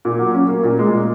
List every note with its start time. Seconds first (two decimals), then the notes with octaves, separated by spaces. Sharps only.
0.05 A#2
0.18 F#3
0.34 C#4
0.49 A#3
0.63 A#2
0.79 G#3
0.93 A#2